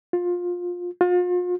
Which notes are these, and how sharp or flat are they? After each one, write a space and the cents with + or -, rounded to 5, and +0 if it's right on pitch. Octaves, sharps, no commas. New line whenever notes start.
F4 +20
F4 +40